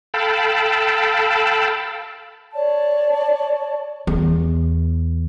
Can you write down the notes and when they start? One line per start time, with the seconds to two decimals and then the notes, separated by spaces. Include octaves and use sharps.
0.14 A4 F5 G5 A5 B5
2.53 C#5 D5 A5
4.07 E2